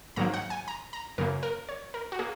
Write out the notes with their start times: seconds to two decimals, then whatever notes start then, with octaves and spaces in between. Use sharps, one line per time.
0.16 G#2 D#3 F#3 A#3 A#5
0.34 F#5
0.50 G#5
0.68 A#5
0.93 A#5
1.18 F#2 C#3 A#3 A#4
1.43 A#4
1.69 C#5
1.94 A#4
2.12 F#4
2.19 A#3 G#4